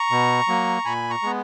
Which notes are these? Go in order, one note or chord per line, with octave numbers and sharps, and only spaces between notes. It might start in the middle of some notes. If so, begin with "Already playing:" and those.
Already playing: A#5 C#6
B2
F#3 A#3
A#2 G#5 B5
A#5 C#6
G#3 B3